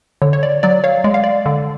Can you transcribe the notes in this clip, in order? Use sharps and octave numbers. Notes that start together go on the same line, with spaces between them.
D3 C#5
C#5
D5
F#3 D5
C#5 F5
G#3 D5
F5
D5
D3